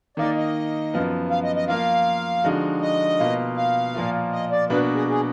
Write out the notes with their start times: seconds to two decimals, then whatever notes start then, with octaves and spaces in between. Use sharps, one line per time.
0.17 D#3 A#3 D#4 D5
0.37 D#5
0.93 F#2 F3 B3
1.30 F5
1.43 D#5
1.56 D#5
1.68 F3 A#3 F4 F5
2.44 D3 F3 G#3 D#4 F#4
2.81 D#5
3.19 B2 A#3 F4
3.57 F5
3.94 A#2 F3 A#3 F4
4.32 D#5
4.51 D5
4.70 B2 A#3 D4 F#4 B4
4.95 G#4
5.08 G#4